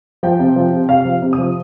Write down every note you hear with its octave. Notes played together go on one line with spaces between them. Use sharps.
F3 G5
C3
F3
C3
C3 F5
F3
C3
D#6
F3